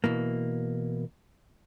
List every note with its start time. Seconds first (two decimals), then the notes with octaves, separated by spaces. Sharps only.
0.04 B2 E3 A#3